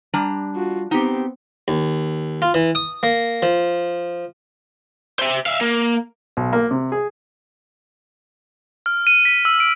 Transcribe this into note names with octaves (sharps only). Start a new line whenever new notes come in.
G3 D4 A#5
F4 F#4
B3 C4 D#4 G4
D#2
F4
E3
D#6
A#3
F3
C5 E5
E5 F5
A#3
B1
A#3
C3
G#4
F6
D#7
B6
E6
D7